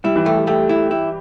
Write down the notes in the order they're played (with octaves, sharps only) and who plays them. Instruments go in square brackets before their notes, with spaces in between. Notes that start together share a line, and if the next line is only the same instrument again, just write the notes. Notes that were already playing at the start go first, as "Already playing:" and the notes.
[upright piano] G3 [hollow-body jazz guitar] E4
[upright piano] E3
[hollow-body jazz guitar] A3 [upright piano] G4
[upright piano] G4
[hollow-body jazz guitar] A3 [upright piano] G4
[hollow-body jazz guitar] E4
E4